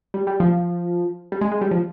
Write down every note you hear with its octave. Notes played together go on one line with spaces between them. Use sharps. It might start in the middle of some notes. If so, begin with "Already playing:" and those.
G3
G3
F3
G3
G#3
G#3
G3
F3